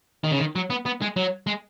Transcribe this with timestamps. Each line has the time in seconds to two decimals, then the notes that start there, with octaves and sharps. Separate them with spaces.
0.24 D#3
0.31 C#3
0.39 D#3
0.56 F#3
0.70 B3
0.86 B3
1.02 G#3
1.16 F#3
1.47 G#3